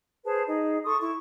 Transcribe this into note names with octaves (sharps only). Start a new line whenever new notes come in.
G#4 B4 C5 A5
D#4 G#4 D#5
A4 C6 C#6 D#6
E4 C#6